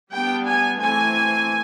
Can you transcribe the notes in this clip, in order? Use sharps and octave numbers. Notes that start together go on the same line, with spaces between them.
G3 B3 D4 G5
G#5
E3 A3 C4 G#5